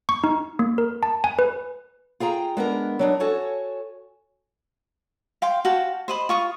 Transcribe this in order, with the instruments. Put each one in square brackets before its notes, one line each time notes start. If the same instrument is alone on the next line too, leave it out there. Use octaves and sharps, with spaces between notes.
[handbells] C#6
D#4
A#3
A#4
A5
G#5
B4
[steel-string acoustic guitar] F4 G#4 G5 A#5
G#3 B3 D4 A#4
F#3 D4 D#4
F#4 A4 C#5 G#5
[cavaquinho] F5 G5 C6
F#4 F5 G5 A5
C5 D#5 B5
F4 C#6 D#6